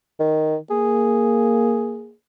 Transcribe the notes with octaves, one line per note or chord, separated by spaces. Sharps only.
D#3
A#3 G#4